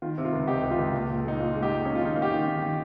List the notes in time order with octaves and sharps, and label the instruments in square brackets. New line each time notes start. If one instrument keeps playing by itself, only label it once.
[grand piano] D#3 F4
C3
F4
C#2
C3 D#4 G4
C#2
F4
C#2
A#2
A#2
G#3 D#4
A#2 F4
G#3
D#4 G4
A#2
C#4 D#4
F4
D#3 D#4
A#3
G4
D#3 F4
D#3
D#3